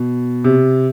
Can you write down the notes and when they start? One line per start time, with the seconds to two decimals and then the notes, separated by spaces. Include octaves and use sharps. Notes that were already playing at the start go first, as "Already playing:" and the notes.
Already playing: B2
0.44 C3